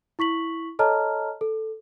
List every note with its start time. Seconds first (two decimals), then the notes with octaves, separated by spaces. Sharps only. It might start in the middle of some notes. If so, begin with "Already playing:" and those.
0.19 E4 C#6 B6 F#7
0.79 A4 C#5 D#5 A5 A#5 F6
1.41 A4